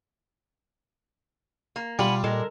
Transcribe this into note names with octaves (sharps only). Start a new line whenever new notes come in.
A#3
B2 G3 F4 F#5 G#5 B5
A#2 G#3 A4 A#4